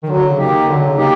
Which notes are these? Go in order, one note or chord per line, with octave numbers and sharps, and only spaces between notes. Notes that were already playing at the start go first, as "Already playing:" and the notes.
D#3
D3 F#3
C#3
A#3 D#4 G4
D#3
D3 F#3
C#3
A#3 D#4 G4